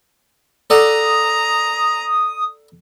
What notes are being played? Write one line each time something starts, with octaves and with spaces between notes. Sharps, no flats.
A4 D5 F#5 A#5 D#6